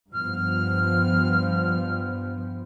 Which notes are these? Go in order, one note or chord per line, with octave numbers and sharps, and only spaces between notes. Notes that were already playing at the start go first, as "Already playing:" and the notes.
G2 F3 B3 F6